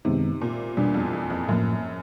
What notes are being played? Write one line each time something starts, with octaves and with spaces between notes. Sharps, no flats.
F#2 C3 D#3 G#3 B3 D#4
A#2
E2 B2 G3 B3 D4
F2
E2
F2
F#2 A2 F3 A#3